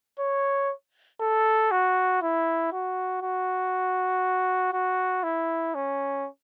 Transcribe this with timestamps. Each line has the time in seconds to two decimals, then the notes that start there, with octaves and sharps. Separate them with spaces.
0.20 C#5
1.21 A4
1.71 F#4
2.22 E4
2.72 F#4
3.22 F#4
4.73 F#4
5.23 E4
5.75 C#4